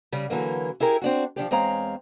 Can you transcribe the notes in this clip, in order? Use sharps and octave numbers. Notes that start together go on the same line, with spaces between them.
C#3 G3
D3 E3 F#3 A#3
E4 G4 G#4 A#4
C4 D4 F#4
F3 F#3 D4 G4
E2 G#3 C4 C#5 F5 A#5